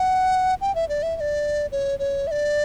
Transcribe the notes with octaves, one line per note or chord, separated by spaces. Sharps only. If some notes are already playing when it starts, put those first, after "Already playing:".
Already playing: F#5
G5
E5
D5
E5
E5
D5
C#5
C#5
E5
D5